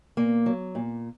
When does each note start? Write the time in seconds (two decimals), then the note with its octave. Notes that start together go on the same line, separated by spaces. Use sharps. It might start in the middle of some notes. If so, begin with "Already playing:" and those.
0.17 A#2 A#3
0.46 F#3
0.75 A#2